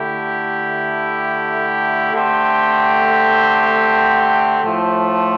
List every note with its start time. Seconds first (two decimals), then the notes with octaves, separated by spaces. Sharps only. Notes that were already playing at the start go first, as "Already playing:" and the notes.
Already playing: D3 A3 E4 G4
2.12 D3 A3 C4 G4
4.64 A2 F3 A3